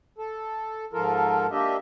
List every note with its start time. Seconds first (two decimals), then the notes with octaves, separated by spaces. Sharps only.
0.18 A4
0.93 G#2 F3 F4 A4 A#4
1.51 A#3 D4 G4 D#5 E5